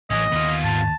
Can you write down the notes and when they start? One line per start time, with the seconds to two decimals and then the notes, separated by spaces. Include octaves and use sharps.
0.10 A1 A2 E3 F#3 C#4 D#5
0.32 D#2 D#3 B3 F4
0.64 G#2 A5